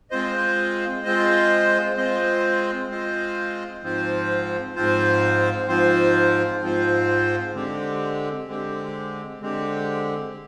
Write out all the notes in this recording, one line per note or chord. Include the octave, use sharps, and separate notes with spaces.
G#3 C4 F4 C5 D#5
G#3 C4 F4 C5 D#5
G#3 C4 F4 C5 D#5
G#3 C4 F4 C5 D#5
G#2 F3 C4 F4 C5
G#2 F3 C4 F4 C5
G#2 F3 C4 F4 C5
G#2 F3 C4 F4 C5
D3 G#3 C4 G4
D3 G#3 C4 G4
D3 G#3 C4 G4